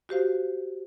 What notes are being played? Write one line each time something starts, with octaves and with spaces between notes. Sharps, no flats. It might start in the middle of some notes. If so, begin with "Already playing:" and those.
F#4 G4 C5 F5